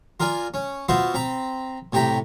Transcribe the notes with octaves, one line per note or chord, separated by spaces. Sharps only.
F4 A#4 D5 G#5
C#4
B3 F4 F#4 C5 E5
C4 A#5 B5
A2 C3 G4 G5 A#5 B5